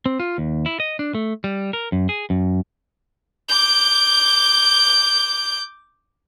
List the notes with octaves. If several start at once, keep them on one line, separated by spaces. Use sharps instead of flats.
C4
F4
D#2
E4
D#5
D4
A3
G3
A#4
F#2
G#4
F#2
D6 G6